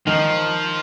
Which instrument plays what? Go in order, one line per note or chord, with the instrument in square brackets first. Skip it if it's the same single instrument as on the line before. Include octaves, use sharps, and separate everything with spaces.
[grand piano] D#3 [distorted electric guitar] F3